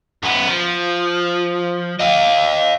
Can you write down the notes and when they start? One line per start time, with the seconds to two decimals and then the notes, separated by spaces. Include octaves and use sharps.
0.23 F#2 B3
0.48 F3
1.99 D#5 F5